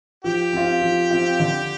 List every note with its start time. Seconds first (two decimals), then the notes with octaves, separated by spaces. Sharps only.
0.24 F3 G4
0.53 C4 F4
0.82 F3
1.11 C4 F4
1.40 D3